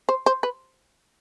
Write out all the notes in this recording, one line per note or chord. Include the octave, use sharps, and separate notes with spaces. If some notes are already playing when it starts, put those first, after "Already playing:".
C5
C5
B4